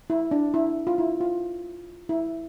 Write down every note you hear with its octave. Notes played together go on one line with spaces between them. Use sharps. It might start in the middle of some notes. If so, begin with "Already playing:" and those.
E4
D4
E4
F4
E4
F4
E4